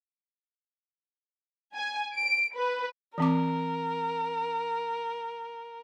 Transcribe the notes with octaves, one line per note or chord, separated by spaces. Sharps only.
G#5
D7
B4
E3 C4 A#4 D6